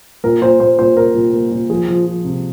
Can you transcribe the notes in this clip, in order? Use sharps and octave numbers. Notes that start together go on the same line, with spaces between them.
A#2 A#4
A#2 C5
A#2 C5
A#2 C5
A#2 A#4
A#2
A#3
A#2
F3 G#4
F3
F3
C3